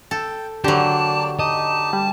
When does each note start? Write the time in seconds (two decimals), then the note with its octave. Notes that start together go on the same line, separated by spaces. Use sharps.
0.11 A4 G5
0.64 D3 F#3 A#3 G4 D5 A5
1.39 D#4 G4 D#5 A5
1.93 G3